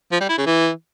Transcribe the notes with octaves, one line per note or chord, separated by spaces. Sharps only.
F3
G3
E4
C#3
E3